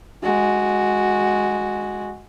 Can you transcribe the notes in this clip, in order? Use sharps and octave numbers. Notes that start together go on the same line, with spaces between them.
G#3 F#4